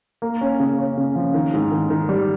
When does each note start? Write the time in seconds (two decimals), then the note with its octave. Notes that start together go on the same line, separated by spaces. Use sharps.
0.22 A#3
0.41 C#4
0.60 C#3
0.78 C#4
0.97 C#3
1.16 F3
1.34 D#3
1.53 G#2
1.72 D#3
1.90 D#3
2.09 G3